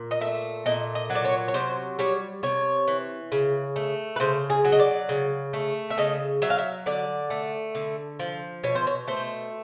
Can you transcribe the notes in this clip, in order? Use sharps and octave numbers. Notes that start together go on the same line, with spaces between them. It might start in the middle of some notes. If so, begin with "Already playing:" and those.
Already playing: A#2
D#5
A3 E5
A#2 D#5
D#5
F#3
D5
C#5
C#5
C3 C5
G3 C#5
C3 C#5
E3
C#3
A3
B4
C#3 C5
G#4
F#3
D#5
D5
C#3
A3
E5
C#3 D#5
F#3 E5
F5
E5
D3 D5
A3
D3
F3
B2 C#5
C5
C#5
A3 C5